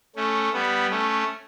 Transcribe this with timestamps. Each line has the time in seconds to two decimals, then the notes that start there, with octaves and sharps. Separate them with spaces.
0.16 A3 C#4
0.53 G3 B3
0.90 A3 C#4